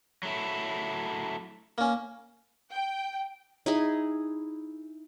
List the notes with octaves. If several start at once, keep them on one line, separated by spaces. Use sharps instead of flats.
F#3 A3 E4
A#3 C#4
G5
D#4 E4 G#4